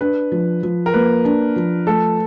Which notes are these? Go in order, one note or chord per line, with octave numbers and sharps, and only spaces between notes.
D4 B4
F3
F3
A#4
A#3 B4
D4
F3
A3 A4